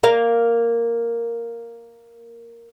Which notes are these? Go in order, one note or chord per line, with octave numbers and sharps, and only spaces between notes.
A#3 A#4 F5